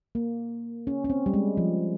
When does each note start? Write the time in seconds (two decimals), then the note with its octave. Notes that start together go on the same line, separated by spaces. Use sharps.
0.15 A#3
0.87 C#4
1.04 C#4
1.10 C4
1.26 G3
1.34 G#3
1.57 F3